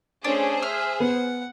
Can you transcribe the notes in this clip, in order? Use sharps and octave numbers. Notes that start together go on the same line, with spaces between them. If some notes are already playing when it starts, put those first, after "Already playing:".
A3 C#4 D4 G#4 C5
E5 F6
B3 F#5